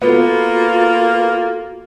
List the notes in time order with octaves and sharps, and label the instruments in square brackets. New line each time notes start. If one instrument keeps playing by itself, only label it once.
[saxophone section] A#3 [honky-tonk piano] B3 [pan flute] F4 [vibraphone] F#4 A4